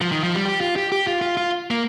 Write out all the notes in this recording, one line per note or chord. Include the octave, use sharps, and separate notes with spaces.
F3
D#3
F3
G3
G4
F4
G4
G4
F4
F4
F4
A#3